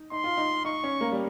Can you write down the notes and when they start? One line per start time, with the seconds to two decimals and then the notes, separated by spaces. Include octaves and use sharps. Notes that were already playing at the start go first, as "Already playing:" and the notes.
Already playing: D#4
0.11 D#4 C6
0.24 F4
0.37 D#4
0.65 D#4 C#6
0.84 C#4
1.01 A#3
1.12 G3